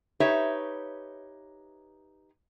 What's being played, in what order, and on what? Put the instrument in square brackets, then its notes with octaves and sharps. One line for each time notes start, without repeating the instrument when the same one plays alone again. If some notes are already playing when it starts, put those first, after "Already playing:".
[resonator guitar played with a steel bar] D#4 G4 B4 C#5 E5